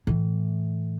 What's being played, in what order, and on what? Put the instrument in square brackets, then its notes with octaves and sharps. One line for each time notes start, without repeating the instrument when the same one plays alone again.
[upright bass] A2 E3